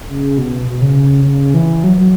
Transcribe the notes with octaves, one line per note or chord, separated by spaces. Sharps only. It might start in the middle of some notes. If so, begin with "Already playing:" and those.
C#3
B2
B2
C#3
C#3
E3
F#3
F#3